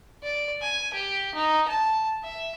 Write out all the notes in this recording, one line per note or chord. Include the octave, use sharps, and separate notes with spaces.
D5
G#5
G4
D#4
A5
E5